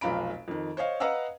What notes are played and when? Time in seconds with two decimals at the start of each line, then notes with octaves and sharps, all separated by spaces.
0.01 F1 B1 F4 A#5 B5 D7
0.48 F2 D#3
0.77 C5 C#5 D#5 F5
1.00 B4 D#5 F5 F#5 A#5 E6